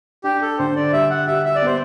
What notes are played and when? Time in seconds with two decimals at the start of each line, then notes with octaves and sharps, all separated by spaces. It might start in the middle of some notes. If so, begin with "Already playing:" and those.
0.24 D4 G4
0.42 A4
0.59 D3 C5
0.76 D5
0.93 G3 E5
1.10 F#5
1.27 G4 E5
1.45 E5
1.55 D5
1.62 B3 C5